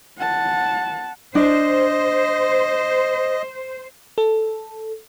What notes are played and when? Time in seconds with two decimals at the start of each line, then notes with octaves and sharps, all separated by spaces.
0.18 F#5 A5
1.35 D4 C5 D#5
4.18 A4